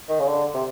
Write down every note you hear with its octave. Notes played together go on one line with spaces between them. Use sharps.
D#3
C#3
D3
C3